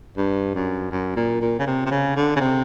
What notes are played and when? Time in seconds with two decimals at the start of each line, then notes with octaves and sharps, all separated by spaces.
0.17 G2
0.55 F#2
0.91 F#2
1.16 A#2
1.42 A#2
1.59 C#3
1.67 C3
1.86 C3
1.91 C#3
2.16 D3
2.36 C#3
2.40 C3